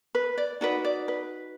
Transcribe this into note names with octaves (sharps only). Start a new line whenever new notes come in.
B4
D5
D#4 F#4 B4 D5
D5
B4